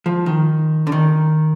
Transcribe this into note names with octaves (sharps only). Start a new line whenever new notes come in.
F3
D#3
D3
D#3